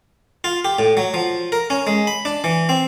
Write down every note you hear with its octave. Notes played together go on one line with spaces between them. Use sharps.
F4
G4
A2
F#3
F3
A#4
C#4
G#3
B5
D4
E3
C4